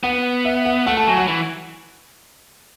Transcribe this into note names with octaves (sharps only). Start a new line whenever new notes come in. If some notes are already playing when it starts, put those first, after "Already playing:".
B3 F#5
E5
F#5
A3 F#5
A5
F#3 G#5
F#5
E3